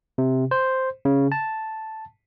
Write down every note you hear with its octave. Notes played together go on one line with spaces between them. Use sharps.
C3
C5
C#3
A5